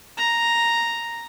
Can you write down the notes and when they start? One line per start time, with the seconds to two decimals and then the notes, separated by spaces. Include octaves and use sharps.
0.17 A#5